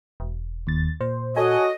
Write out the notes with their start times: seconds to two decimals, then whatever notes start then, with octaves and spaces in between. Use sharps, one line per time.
0.20 E1
0.67 D#2 A6
1.01 A#2 C5
1.36 F#4 A4 C#5 D#5 G#5